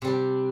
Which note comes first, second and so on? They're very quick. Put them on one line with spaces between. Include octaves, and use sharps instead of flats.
C3 G3 D4